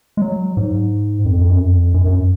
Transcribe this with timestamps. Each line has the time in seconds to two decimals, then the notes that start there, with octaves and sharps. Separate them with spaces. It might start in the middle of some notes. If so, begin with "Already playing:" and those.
0.17 G#3
0.22 F#3
0.57 G#2
1.25 F2
1.37 F2
1.49 F#2
1.60 F2
1.94 F#2
2.05 F#2